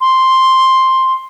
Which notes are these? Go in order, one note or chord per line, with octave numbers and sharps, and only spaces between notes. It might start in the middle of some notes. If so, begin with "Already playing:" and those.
C6